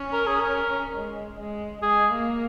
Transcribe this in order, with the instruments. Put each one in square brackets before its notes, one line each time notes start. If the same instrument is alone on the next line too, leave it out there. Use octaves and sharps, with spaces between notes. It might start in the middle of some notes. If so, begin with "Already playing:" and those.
Already playing: [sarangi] C#4
[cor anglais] A#4
G#4
A#4
[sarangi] G#3
G#3
[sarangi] G#3 [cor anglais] G#4
[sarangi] A#3